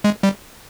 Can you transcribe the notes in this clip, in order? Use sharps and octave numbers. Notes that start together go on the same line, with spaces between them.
G#3
G3